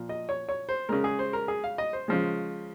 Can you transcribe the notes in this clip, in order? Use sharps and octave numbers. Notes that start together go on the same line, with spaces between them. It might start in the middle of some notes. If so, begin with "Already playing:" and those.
Already playing: A#2 F3
D#5
C#5
C#5
C5
C#3 G#3 A#4
G#4
C5
A#4
G#4
F5
D#5
C5
C#3 F3 G#3